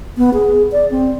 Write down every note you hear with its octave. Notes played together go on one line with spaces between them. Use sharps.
B3
G#4
D5
C4